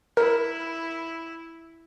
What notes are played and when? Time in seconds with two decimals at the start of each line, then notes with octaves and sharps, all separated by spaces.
0.17 E4 A#4